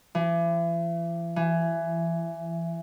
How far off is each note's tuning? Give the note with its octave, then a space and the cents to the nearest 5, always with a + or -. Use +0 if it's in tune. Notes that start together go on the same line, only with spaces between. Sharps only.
E3 +40
E3 +20